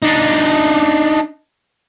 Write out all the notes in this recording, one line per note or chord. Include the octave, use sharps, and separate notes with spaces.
D4 D#4